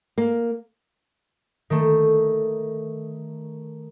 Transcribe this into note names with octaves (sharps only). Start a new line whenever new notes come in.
A#3
D#3 A3